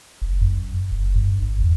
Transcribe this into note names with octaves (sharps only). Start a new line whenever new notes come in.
F#1
F#2
F#1
G2
G1
E2